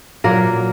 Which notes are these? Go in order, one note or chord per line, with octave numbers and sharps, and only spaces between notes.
A#2 F#3 A#3 A#4